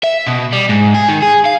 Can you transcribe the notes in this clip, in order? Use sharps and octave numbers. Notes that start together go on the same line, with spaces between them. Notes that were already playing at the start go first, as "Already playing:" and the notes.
E5
B2
G3
G#2
G#4
D#3
G#4
F5